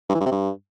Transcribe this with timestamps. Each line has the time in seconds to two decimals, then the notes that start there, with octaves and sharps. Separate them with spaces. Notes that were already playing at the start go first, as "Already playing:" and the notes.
0.10 G2
0.15 E3
0.21 G2
0.26 C3
0.32 G2